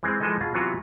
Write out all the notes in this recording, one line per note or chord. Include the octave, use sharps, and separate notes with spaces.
E3 G#3 C4
E3 F3 G#3 D#4 A4 D#5
B2 F4 G#4 F5 A#5
C3 E3 F#3 B3 F4 F#4